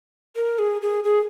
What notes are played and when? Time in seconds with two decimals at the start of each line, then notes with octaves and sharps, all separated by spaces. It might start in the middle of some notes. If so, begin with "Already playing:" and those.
0.36 A#4
0.59 G#4
0.82 G#4
1.04 G#4